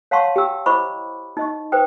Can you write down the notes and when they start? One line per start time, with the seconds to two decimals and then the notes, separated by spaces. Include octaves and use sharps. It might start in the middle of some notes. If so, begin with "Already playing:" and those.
0.11 C#5 F5 F#5 A5 C6 C#6
0.36 G4 G5 E6
0.66 E4 C5 D#5 B5 C#6 D6
1.37 D#4 D#5 C#6
1.72 B4 C5 G5 D#6